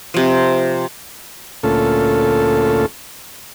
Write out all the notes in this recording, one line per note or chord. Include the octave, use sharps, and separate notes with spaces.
C3 F3
D2 A#2 A3 C#4 F4 A4